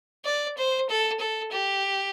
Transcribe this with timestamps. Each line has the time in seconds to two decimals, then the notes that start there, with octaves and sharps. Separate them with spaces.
0.25 D5
0.57 C5
0.89 A4
1.19 A4
1.51 G4